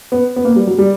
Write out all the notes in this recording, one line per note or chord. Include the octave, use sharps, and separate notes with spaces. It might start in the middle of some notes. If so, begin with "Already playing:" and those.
B3
B3
A#3
G3
F#3
G3